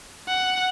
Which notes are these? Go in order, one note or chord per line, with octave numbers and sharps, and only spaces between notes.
F#5